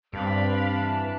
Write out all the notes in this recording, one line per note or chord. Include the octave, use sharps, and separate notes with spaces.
G2 C4 D4 F5 B5
E3 A5